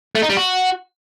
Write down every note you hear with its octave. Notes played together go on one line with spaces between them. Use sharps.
A3
D#4
G3
F#4